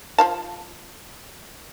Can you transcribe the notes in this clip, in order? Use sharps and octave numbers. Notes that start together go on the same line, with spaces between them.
F3 F5 A5